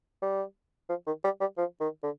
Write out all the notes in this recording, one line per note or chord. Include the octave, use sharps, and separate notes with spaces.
G3
F3
D#3
G3
G3
F3
D#3
D3